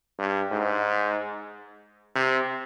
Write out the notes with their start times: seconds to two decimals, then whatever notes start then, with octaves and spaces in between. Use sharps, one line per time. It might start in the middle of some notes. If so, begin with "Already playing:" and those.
0.19 G2
0.51 G#2
2.16 C3